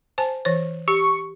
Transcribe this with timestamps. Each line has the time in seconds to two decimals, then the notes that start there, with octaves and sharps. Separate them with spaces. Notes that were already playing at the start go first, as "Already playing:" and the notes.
0.18 C5 G#5 A5
0.45 E3 C5
0.88 G4 C#6